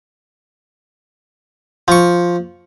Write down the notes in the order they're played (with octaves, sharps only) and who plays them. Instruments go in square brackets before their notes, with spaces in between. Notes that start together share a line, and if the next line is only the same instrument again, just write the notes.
[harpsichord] F3 C#6